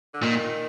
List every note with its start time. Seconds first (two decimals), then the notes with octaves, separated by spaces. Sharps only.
0.14 D3
0.22 A#2 D#3